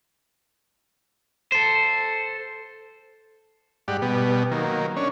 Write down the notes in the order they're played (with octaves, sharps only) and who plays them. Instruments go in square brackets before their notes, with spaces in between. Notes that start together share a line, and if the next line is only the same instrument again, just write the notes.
[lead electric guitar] A4 C5
[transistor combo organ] G#2 G3 G4 D5 F#5
B2 G3 B3
D#3 F#3 A#3
C#4 D4 C#5